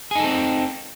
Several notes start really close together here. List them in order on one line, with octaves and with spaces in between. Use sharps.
G#4 D#4 A4 C4